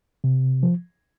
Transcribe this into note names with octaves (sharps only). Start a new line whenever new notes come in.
C3
F3